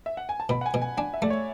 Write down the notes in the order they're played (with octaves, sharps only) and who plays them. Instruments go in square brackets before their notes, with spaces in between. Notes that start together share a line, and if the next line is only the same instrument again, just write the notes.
[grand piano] E5
F#5
G#5
A5
[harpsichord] B2 [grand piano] B5
[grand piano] F#5
G#5
[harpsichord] B2
[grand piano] G#5
[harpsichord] D4 [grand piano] G#5
[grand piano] E5
[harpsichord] A3 [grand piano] D5
[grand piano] C#5